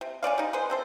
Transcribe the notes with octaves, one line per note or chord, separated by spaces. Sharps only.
C3
C#4 B4 D5 F5
G3 D#4
G#4 B4 C5
C4 A4 C5